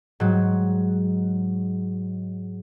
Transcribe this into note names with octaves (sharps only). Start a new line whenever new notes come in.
G#2 F#3